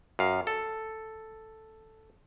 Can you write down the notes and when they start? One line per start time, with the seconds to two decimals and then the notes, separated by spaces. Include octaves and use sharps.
0.19 F#2 F5
0.47 A4